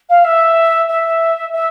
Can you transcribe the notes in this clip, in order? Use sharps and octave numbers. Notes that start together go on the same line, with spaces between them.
F5
E5
E5
E5